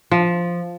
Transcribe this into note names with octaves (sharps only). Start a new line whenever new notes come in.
F3